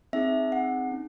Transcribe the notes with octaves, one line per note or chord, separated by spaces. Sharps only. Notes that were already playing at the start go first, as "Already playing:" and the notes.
C4 D#4 G#4 E5
F#5
C#4